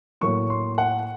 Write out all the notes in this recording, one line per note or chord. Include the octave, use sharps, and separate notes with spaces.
A2 F#3 A#3 C#6
C6
F#5